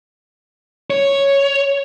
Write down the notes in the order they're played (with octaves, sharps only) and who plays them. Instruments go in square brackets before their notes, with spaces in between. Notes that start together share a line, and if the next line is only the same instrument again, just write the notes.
[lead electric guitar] C#5